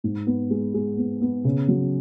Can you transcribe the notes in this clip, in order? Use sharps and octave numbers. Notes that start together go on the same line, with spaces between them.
G#2
B3
G#3
G#3
B3
B3
C#3
F#3